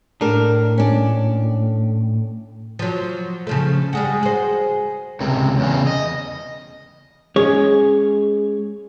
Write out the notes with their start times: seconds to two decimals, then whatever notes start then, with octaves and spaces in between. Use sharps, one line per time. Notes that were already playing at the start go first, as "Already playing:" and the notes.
0.21 A2 D4 A#4
0.78 C#4 D4
2.79 F3 F#3
3.47 C#3 F3 A3
3.93 G3 G#3 F#4 G#4
4.23 F#4 C5
5.20 C#2 C3
5.59 E2 C#3
5.87 D#5
7.36 G#3 C#4 G#4 C#5